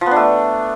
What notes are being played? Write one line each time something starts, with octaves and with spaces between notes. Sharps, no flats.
F3
B3
D4
A3